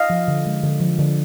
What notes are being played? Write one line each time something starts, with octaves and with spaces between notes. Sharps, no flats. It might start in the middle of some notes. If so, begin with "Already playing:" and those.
Already playing: D#5 F5
F3
D3
G#3
D3
F3
D3